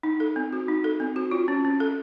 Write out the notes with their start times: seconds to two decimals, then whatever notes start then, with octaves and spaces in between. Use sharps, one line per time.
0.03 D#4
0.20 A4
0.36 C4
0.53 F#4
0.68 D#4
0.84 A4
1.00 C4
1.16 F#4
1.31 F4
1.48 C#4
1.65 C#4
1.80 A4